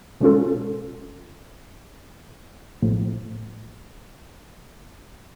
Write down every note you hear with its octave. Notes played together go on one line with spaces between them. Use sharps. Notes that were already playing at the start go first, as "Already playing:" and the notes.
B2 G#3 C#4 F4 A4
A#1 A2 F3